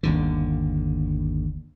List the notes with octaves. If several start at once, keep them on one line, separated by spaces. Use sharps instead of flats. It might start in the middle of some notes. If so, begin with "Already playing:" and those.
G1 D#2 D3